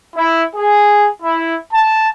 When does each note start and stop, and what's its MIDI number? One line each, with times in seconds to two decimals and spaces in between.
0.16 0.43 64
0.55 1.09 68
1.23 1.56 64
1.73 2.11 81